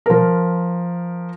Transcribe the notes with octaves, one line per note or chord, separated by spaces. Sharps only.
F3 A#4